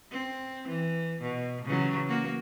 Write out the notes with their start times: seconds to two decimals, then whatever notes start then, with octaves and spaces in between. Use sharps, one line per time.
0.11 C4
0.68 E3
1.21 B2
1.65 C#3 E3 F#3
2.08 A#3 F#4